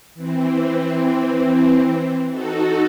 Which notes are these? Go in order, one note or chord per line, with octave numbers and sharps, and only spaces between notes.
E3 C4
D#4 F#4 A4